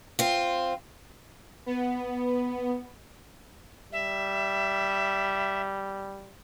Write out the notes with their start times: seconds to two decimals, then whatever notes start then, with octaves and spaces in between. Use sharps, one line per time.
0.19 C4 F4
1.66 B3
3.92 G3 E5